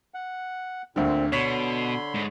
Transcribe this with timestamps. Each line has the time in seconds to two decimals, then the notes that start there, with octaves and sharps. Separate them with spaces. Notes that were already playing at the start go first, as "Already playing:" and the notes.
0.14 F#5
0.96 D2 A#2 D3 C4
1.32 B2 D3 C#5 B5 C6 B6
2.14 G#2